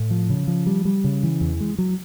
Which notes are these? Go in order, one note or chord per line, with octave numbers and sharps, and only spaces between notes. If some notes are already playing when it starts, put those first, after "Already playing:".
Already playing: A2
F3
C#3
F3
G3
G3
C#3
E3
E2
G#3
F#3